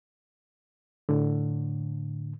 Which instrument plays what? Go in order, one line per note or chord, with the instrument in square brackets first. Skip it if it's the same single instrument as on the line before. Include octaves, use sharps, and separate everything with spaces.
[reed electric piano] A2 D3